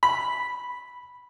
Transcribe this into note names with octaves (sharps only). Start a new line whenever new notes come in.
B5